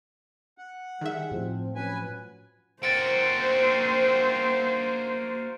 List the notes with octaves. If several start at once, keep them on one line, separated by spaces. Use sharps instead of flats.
F#5
D#3 G3 G#4 E5
A2 F3 C4
F3 F#3 C#4 B4 G#5
A#3 C4 F#4 C5 A6 C#7 D7